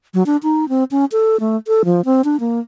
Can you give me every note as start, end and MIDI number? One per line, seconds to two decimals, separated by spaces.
0.14 0.23 54
0.26 0.37 62
0.43 0.68 63
0.69 0.84 60
0.91 1.05 61
1.12 1.37 69
1.40 1.57 57
1.68 1.83 69
1.85 2.01 53
2.05 2.22 60
2.24 2.37 62
2.40 2.60 58